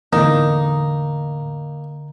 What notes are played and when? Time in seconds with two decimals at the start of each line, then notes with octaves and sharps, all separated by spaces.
0.13 E2 A2 D3 A#3 D#4